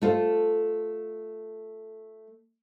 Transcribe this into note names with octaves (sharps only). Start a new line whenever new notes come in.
A3 F4 C5